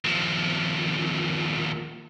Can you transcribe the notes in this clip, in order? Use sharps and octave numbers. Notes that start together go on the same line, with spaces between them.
D#2 F3